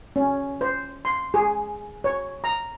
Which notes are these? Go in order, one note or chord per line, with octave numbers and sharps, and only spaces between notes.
C#4
C5
C6
G#4
C#5
A#5